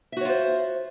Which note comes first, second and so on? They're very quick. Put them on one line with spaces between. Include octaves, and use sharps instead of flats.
E5 F#4 C#5 F4 C5